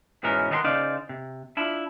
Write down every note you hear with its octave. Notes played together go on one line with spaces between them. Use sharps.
G#2 B2 E3 C#4 A#4
D#3 B3 A#4 F5 C6
C#3 D#4 C5 D5 F5
C3
D4 E4 F4 E5